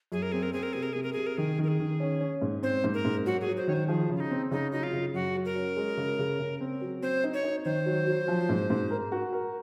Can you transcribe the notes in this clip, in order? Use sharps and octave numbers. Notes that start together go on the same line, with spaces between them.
F#2 G#4
A#4
C4 G#4
A#4
C4 G#4
A#4
C3 G#4
A#4
C3 G#4
A#4
C3 G#4
A#4
D#3 G#4
D#3 A#4
G#4
D#3
C#4
C#4
G#2
C4 C5
G#2
A#4
G#2
F#3 F#4
G#4
F#3
C5
D#3 C#5
C5
F3 G#4
C#3
F4
D#4
C4
C#3 D#4
F#3 D#4
F4
C#3
F#2 F#4
F#3
A#4
C#4
G#3
C#3
C#3
C#3
C4
F#3
C4 C5
D#4
C#5
D#4
D#3 C5
F#3
F#3
F3
G#2
G#2
A#4
F#4
A#4